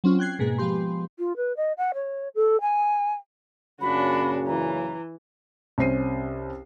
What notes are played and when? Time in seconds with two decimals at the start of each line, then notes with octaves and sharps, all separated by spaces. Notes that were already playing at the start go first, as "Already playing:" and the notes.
0.04 F#3 C4 C#4 F4
0.19 G5 F#6 G#6 C7
0.39 G#2 B2 G#3 A#3 G#4
0.58 F3 G#3 B3 G4 C6
1.19 F4
1.36 B4
1.57 D#5
1.77 F#5
1.94 C#5
2.35 A4
2.61 G#5
3.81 F#2 A#2 C#3 D4 F#4 B5
4.47 E3 A#5
5.78 C2 C#4 C5 C7 D#7